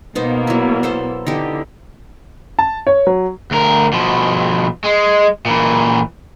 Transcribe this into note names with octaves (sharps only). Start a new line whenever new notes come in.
B2 A#3 B3 D#4 C5
F#3 E4
B3 A4 C5
D3 D#4 E4 G4
A5
C#5
F#3
D2 A#4
B2 F3
G#3
A#2 E3